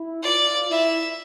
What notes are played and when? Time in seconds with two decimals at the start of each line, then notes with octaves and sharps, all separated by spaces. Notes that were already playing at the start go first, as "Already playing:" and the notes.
Already playing: E4
0.23 F4 D5
0.70 E4 E5